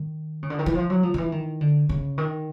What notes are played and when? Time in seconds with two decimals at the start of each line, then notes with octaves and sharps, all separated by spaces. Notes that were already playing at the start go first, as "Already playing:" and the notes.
Already playing: D#3
0.43 C#3
0.50 D3
0.59 D#3
0.66 E3
0.75 F3
0.90 F#3
1.03 F3
1.14 D#3
1.18 E3
1.32 D#3
1.61 D3
1.89 C#3
2.18 D#3